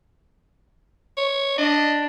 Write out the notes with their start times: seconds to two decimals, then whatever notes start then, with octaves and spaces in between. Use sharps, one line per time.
1.17 C#5
1.58 D4 D#5